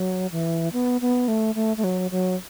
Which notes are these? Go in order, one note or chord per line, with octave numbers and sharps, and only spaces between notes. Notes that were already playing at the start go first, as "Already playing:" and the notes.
Already playing: F#3
E3
B3
B3
A3
A3
A3
F#3
F#3